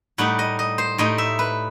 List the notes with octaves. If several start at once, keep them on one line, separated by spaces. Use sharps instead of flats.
A2 G3 D#4 F#5
D#5
D#5
C5
A2 G3 D#4 D#5
E5
B4